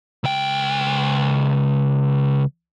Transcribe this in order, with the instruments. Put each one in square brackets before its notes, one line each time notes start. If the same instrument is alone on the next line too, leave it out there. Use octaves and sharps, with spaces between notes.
[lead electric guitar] C#2 G5